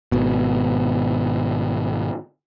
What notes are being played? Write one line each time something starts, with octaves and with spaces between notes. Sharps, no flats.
G#1 B2